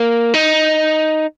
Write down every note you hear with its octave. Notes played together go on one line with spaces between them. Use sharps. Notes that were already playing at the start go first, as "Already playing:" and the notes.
Already playing: A#3
D#4